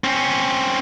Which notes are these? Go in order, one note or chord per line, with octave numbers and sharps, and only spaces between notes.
C4 C#4